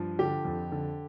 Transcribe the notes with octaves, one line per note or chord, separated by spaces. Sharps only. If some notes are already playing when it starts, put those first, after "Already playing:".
Already playing: G2 F3
D3 G4
F2
D3